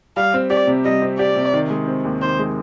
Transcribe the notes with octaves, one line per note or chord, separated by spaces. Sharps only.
G3 F5
C4
G4 D5
C3
G3 D#5
C4
G4 D5
C3
D#3
G#3
C4
D#2
D#3 C5
G#3